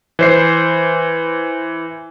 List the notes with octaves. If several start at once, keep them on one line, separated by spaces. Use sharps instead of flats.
E3 C5 C7